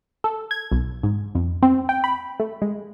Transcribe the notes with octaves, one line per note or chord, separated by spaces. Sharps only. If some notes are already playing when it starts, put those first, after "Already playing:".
A4
G#6
B1
G#2
F2
C4
G5
B5
A3
G#3